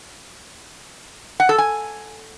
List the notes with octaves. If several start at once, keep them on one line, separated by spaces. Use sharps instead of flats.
F#5
A4
G#5